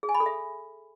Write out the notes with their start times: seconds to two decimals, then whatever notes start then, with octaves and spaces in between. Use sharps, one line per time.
0.03 G#4
0.09 G#5
0.15 B5
0.20 A4
0.26 E5